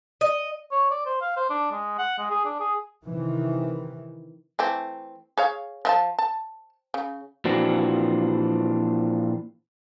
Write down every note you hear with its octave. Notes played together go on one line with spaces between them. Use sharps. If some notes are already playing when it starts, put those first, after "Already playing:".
D#5
C#5
D5
C5
F5
C5
D4
G#3
F#5
G#3
G#4
D4
G#4
C3 D#3 E3
E3 A3 C4
G#4 C#5 F5
F3 E5 A5
A5
C#3
A#2 E3 F3 C4 D4 F#4